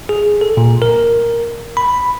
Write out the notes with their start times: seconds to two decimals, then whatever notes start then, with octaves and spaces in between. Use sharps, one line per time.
0.09 G#4
0.41 A4
0.57 A#2
0.82 A#4
1.77 B5